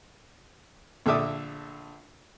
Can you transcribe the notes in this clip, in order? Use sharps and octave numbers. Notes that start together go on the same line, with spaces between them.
A#1 D3 D4 E5 D6 D#6